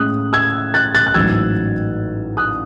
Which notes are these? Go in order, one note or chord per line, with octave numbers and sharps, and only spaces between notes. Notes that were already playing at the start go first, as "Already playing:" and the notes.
Already playing: A2 G#3 C#4 D#6 F#6
E6 G#6
F#6 A6
F#6 A6
F#6
A1 G#2 F#3 E6 G#6
D#6 F#6